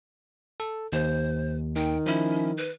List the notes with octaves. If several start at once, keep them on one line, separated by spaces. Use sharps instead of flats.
A4
D#2 C5
D#3 G5
F3 C#4 E4
B4